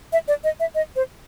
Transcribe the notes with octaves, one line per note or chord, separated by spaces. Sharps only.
E5
D5
D#5
E5
D#5
C5